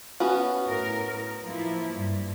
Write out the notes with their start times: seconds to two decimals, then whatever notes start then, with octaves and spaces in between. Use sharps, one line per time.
0.20 B3 C#4 F#4
0.66 A2 A#4
1.43 F3 A#3 E4
1.92 G2